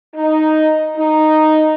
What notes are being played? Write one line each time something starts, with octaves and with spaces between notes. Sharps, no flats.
D#4
D#4